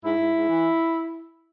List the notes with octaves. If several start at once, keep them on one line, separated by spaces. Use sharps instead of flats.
G#2 E4
G#2
G#2
E3